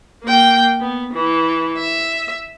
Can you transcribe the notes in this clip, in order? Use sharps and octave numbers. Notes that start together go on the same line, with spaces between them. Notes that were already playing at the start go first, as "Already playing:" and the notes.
A#3 G5
B3
E3
E5